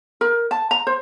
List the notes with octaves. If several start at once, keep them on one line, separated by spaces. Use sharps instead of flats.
A#4
A5
A#5
C5